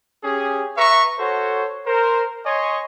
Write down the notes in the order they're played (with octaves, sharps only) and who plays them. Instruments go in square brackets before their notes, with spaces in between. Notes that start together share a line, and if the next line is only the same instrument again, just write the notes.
[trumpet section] C#4 G4 G#4
B4 E5 A#5 C#6
F#4 A4 C5 C#5
A#4 C5
C#5 D#5 G#5 C6 C#6